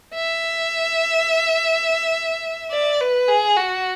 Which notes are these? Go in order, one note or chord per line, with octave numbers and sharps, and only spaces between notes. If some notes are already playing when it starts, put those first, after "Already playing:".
E5
D5
B4
G#4
F#4